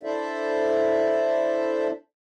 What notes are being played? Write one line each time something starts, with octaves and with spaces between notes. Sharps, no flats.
D4 E4 A4 C5 D5 E5